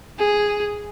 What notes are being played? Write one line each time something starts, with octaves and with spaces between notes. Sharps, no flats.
G#4